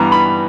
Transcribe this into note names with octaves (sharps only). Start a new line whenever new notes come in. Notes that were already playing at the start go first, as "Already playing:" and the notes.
Already playing: G2 E3 G3 B3 A#5
B5